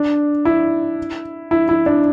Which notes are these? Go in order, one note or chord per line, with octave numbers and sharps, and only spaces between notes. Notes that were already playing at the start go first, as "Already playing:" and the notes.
Already playing: D4
E4
E4
E4
D4